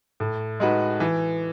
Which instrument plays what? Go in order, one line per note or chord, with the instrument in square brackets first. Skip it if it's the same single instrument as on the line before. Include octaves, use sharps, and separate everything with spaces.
[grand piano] A2
G#3 D#4 F#4 B4
E3